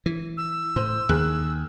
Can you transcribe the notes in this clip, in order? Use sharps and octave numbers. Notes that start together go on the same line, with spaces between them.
E3
E6
A2 C5
D#2 D#3 G#4 F#6